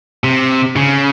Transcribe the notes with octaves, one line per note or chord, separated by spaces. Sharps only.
C3
C#3